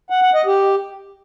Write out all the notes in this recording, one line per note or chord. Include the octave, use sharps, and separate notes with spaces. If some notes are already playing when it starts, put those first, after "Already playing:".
F#5
F#5
D#5
G4